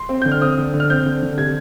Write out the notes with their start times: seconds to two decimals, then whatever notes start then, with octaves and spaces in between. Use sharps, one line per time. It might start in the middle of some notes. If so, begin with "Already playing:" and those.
Already playing: C6
0.09 C4
0.22 D3 G6
0.32 F6
0.42 C4 D#6
0.58 D3
0.74 D3
0.80 F6
0.90 C4 G6
1.06 D3
1.22 D3
1.37 C3 G#6